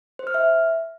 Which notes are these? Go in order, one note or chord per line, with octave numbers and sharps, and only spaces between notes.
C5
F6
E5